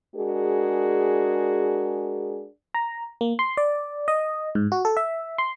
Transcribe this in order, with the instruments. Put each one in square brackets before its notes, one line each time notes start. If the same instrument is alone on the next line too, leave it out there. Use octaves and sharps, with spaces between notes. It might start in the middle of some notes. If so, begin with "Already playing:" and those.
[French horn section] G#3 D4 F#4 G#4 A#4
[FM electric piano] A#5
A#3
C6
D5
D#5
G#2
F#4
A4
E5
C6